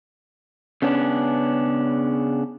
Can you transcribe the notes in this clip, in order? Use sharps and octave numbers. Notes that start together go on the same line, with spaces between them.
C#3 B3 C#4 D4